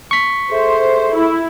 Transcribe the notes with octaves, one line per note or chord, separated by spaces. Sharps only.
C#6 B6
G#4 A4 C5 E5
E4